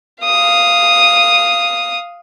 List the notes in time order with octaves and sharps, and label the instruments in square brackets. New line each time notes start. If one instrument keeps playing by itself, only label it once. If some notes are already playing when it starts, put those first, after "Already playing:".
[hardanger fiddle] F5 D#6